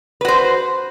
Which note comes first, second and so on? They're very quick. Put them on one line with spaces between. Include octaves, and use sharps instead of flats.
B4 F#4 C5